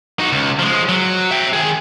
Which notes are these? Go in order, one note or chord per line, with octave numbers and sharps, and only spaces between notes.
D#4 F#4
C#2
F3 G#3
F#3
E5 G5
D#3 G#4